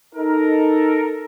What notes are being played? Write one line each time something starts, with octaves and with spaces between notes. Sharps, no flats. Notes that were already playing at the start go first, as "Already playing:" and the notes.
D#4 A4 A#4